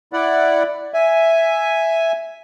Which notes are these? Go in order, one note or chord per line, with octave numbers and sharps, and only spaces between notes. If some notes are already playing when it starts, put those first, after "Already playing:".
E4 D5 F#5
E5 G#5